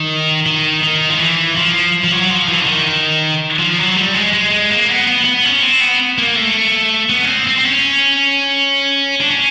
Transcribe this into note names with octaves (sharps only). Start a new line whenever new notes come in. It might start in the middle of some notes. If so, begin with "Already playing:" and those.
Already playing: D#3
D#3
D#3
F3
E3
F3
F3
F#3
F3
E3
D3
D#3
F3
F#3
G3
G#3
G#3
G#3
A#3
B3
B3
B3
C#4
C4
B3
A#3
A3
B3
C#4
C4
C4
C4
C#4
D4
C#4